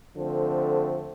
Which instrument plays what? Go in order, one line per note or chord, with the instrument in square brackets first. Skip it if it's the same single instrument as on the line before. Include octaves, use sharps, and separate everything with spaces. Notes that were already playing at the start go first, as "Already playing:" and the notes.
[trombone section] D3 F3 A3 C4